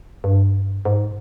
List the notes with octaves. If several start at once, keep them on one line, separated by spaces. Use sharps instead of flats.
G2
G#2